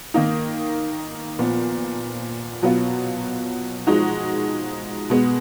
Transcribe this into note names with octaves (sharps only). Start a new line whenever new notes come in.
D#3 A#3 D#4
A#2 F3 B3
B2 F#3 B3 F4
F3 G#3 D#4 F#4
B2 G#3 B3